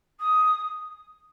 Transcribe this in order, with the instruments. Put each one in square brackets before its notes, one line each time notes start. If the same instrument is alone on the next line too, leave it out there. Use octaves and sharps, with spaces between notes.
[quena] D#6